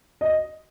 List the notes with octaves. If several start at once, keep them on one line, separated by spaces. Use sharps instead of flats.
D#5